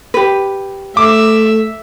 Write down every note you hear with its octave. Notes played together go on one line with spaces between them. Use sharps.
G4 B4
A3 E5 D6